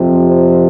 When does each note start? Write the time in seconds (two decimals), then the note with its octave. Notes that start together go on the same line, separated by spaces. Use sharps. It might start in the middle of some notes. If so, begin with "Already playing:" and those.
Already playing: F2 C3 F3
0.28 C5